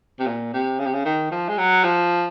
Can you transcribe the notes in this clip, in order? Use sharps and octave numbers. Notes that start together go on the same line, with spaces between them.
C3
A#2
C3
C#3
C3
C#3
D#3
F3
G#3
F#3
F3